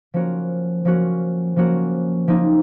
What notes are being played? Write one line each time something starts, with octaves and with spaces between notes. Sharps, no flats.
F3 A#3 C#4 F#4 A#4
F3 A#3 C#4 F#4 A#4
F3 A#3 C#4 F#4 A#4
F3 A#3 D#4